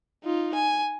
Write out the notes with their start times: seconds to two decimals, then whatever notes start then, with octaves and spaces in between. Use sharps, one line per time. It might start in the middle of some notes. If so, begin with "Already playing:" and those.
0.24 D#4 F4
0.55 G#5